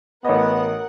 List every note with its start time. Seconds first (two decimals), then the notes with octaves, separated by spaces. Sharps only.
0.25 A1 B3 A#4 C#5 D#5 F#5